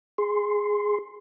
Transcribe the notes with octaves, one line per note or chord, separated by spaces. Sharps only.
G#4 C6